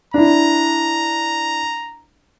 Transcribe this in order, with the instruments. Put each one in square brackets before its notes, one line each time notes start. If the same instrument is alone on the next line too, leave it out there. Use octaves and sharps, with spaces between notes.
[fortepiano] D4 E4 [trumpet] A#5